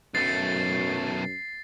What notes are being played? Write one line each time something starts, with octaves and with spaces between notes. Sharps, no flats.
B1 F#2 A3 A6 C7